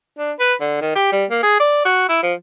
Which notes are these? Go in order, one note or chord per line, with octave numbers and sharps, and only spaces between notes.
D4
B4
D3
D#3
G4
G3
A#3
G#4
D5
F#4
E4
F3